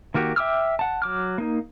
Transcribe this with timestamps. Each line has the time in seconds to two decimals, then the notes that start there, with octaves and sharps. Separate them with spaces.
0.14 D#3 A#3 F#4 G4
0.36 E5 G5 D6 E6 F6
0.79 F#5 A5
1.02 F#3 D6 F6
1.38 A#3 D#4